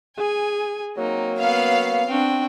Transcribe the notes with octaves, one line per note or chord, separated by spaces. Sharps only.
G#4 G#5
F#3 A#3 C4 D#4
B3 C#4 F5
C4 D4 F#4 G5